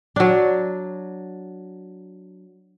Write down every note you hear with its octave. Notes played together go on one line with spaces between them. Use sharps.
F#3 D4